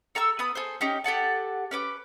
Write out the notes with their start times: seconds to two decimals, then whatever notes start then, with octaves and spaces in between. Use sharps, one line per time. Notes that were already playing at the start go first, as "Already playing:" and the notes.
0.15 A4 A#5 C#6 E6
0.39 B3 B5 D#6
0.55 G#4 A4 C5
0.81 C#4 D#4 G4
1.04 G4 A4 F#5 A5
1.71 C#4 B4 D6